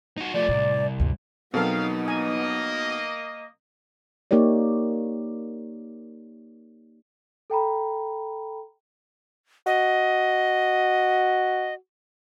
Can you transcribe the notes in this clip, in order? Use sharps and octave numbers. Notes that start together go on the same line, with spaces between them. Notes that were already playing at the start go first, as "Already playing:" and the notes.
D#4 F#4
F3 A3 D5
C2 A2
D2 G2
B2 F#3 B3 C4 D#4 A4 A#4 F5
A#3 D#5 G#5
A#3 D#4 G4 C#5 D5
A4 G5 A#5 B5
F#4 D#5